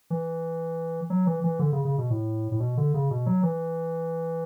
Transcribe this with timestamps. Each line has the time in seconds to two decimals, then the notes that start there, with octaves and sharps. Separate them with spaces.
0.10 E3
1.10 F#3
1.27 E3
1.44 E3
1.59 D3
1.72 C#3
1.85 C#3
1.98 B2
2.10 A2
2.52 A2
2.60 B2
2.77 D3
2.94 C#3
3.11 B2
3.26 F#3
3.43 E3